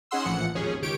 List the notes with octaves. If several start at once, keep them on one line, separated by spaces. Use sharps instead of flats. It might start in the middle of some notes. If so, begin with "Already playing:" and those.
C#4 D#4 G#4 F#5 C6 E6
A#1 A2 E3 F3 F#5 C#7
G#1 D#2 F3 C#4 G#4
C#2 D#3 G4 C#5 D7